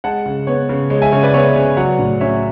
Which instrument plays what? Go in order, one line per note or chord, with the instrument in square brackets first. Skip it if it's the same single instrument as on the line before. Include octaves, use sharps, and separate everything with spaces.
[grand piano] G#3 F#5 A5
C#3
B3 C#5
C#3
G#3 C#5
E5 G#5
C#3 C#5
B4 D5
B3 C#5 E5
C#3
F#3 D5 F#5
A2
C#4 C#5 E5